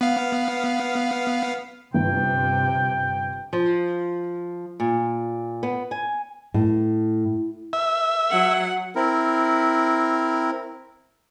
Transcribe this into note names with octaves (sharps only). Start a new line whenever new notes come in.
B3 F5
G1 C3 G5
F3
A#2
B3
G#5
A2
E5
F#3 F#5
C4 E4 A#4